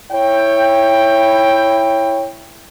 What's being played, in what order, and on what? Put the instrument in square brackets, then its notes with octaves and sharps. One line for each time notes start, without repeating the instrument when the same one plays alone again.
[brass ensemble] E4 C#5 G5